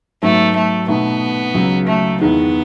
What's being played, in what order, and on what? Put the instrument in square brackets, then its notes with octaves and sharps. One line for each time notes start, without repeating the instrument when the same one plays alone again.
[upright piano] G#2 F#3 B3 F#4 A4 [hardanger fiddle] A3
[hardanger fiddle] A3
[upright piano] B2 A3 D#4 [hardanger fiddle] B3
[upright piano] C#2 C#3 F#3
[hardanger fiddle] A3
[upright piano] E2 D#3 G#3 [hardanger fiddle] B3